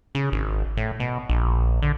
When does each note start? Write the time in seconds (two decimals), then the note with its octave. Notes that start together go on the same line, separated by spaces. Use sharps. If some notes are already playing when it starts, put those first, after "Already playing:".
0.15 C#3
0.32 G#1
0.77 A2
1.00 B2
1.29 A#1
1.82 D3